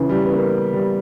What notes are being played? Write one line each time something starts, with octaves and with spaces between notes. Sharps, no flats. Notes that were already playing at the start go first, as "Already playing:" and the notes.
Already playing: C#3 E3
G3
B3
A#3
G3